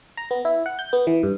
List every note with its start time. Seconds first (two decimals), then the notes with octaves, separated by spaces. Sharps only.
0.17 A#5
0.31 B3
0.45 E4
0.66 F#5
0.79 G6
0.93 B3
1.07 E3
1.23 G2